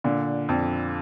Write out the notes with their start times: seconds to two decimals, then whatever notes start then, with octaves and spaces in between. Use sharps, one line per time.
0.04 A#2 D3
0.49 F2